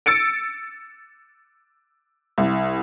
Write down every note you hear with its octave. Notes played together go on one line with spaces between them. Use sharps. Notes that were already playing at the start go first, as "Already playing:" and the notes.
E6 A6 C#7 D7
C2